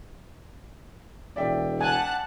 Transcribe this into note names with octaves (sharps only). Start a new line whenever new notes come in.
E1 D5 E5 G5
F#5 G#5 A5 F#6